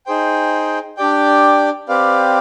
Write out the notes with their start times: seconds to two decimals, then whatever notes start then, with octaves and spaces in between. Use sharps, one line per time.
0.06 D#4 G#4 C5 G5
0.97 D4 G4 D5 G5
1.88 C4 G4 B4 D5 F5